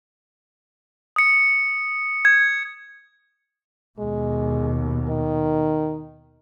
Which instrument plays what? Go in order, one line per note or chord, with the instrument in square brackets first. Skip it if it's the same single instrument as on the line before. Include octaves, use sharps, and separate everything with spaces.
[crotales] D#6 C#7
G#6
[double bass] D#2 B2 [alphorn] G#3
[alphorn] D#3